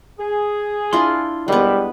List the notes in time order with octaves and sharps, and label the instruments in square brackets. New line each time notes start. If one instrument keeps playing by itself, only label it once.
[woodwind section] G#4
[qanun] D4 E4 F4 [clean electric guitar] C6
[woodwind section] D#2 B2 [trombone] G3 [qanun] G#3 B3